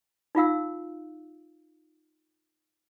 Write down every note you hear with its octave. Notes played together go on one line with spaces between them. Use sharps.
D#4 F4 F5 E6